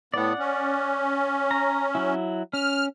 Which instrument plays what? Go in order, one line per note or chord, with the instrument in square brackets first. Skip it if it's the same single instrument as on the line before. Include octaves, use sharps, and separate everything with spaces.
[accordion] A2 B3 [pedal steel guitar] D5 F#5
[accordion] C#4
[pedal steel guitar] A#5
F#3 E4
[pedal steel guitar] C#4 [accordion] F6